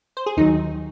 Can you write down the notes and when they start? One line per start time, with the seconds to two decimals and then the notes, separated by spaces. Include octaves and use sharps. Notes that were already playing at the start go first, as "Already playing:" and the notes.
0.17 C5
0.26 G#4
0.37 D#2 D#3 F#3 D#4